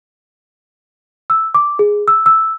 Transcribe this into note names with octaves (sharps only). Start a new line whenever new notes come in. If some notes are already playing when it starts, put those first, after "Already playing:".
E6
D6
G#4
E6
E6